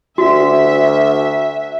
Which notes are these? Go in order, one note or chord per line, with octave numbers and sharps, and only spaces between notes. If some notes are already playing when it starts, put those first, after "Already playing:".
D2 F#4 E5